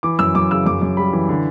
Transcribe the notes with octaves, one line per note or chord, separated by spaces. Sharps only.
E3 D6
F#2 E6
F#2 D6
C#3 E6
F#2 D6
F#2
G3 B5
E3
D3